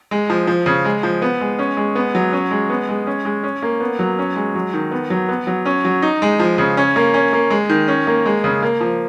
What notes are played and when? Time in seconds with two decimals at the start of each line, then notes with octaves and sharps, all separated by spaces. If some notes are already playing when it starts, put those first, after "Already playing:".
0.11 G#3
0.30 F3
0.47 F3
0.66 C#3
0.85 G#3
1.03 F3
1.22 B3
1.41 G#3
1.59 C#4
1.77 G#3
1.95 B3
2.15 F#3
2.33 C#4
2.51 G#3
2.70 B3
2.89 G#3
3.07 C#4
3.25 G#3
3.43 C#4
3.62 A#3
3.80 B3
3.99 F#3
4.18 C#4
4.36 G#3
4.55 F#3
4.73 D#3
4.91 B3
5.10 F#3
5.29 B3
5.47 F#3
5.65 C#4
5.85 F#3
6.02 D#4
6.22 G#3
6.39 F3
6.58 C#3
6.77 C#4
6.96 A#3
7.14 C#4
7.33 A#3
7.50 G#3
7.69 D#3
7.88 C#4
8.07 A#3
8.26 G#3
8.44 C#3
8.63 A#3
8.81 F3